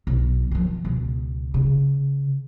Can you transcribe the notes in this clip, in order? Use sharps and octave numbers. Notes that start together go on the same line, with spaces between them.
B1
D#3 F3
C#2 B2
C#3